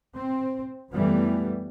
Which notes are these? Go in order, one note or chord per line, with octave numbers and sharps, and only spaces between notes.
C4
F#2 E3 G3 A3 B3